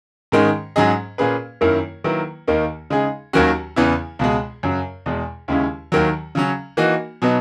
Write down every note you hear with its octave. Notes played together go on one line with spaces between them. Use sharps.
G#2 D#3 G#3 C#4
G#2 F#3 C#4 G#4 D#5
A#2 A#3 C#4 G#4 B4
F#2 D#3 A#3 E4 A#4
D#3 F#3 A#3 E4 B4
D#2 D#3 A#3 D#4
C#3 G#3 D#4 G#4
D#2 D#3 F#3 C#4 F#4
E2 C#3 E3 B3 E4
C#2 B2 G#3
F#2 C#3 F#3
E2 B2 G#3
D#2 C#3 G#3 C#4 E4
D#2 D#3 F#3
C#3 F#3 C#4
E3 A#3 D#4 F#4
B2 F#3 B3 D#4